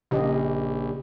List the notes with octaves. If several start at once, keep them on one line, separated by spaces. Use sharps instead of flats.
A#1 C#3 G4 D#5